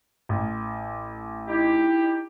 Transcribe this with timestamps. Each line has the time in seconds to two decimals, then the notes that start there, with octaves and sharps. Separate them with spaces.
0.29 A1
1.48 D#4 E4 G4